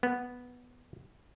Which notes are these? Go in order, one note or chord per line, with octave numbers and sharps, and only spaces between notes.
B3